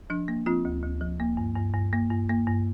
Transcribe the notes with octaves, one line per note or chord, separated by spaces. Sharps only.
F3 D4
A#3
F3 C4 F4
D2
D2
F3
A#3
G2
G2
G2
A#3
G2
A#3
G2